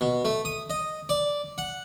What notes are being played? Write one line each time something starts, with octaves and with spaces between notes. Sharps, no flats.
B2
A3
D#6
D#5
D5
F#5